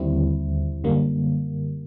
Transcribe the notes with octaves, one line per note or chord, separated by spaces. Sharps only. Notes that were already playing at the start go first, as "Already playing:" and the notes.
Already playing: D#2 D3 G3 C4 E4
F#2 D3 G3 A#3